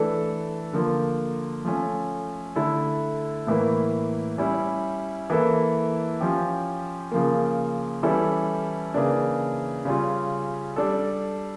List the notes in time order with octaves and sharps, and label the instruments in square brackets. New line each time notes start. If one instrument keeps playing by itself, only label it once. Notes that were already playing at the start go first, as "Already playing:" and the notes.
Already playing: [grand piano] E3 A3 D4 A4
D3 F3 A#3
F3 A3 C#4
D3 A3 E4 A4
A2 E3 A#3 E4
G3 C#4 E4
E3 A#3 E4 A4
F3 C#4 G4
C#3 F3 A#3
E3 G3 C#4 E4 A4
C#3 E3 A#3 D4
C#3 G3 C#4 F4
G3 D4 A4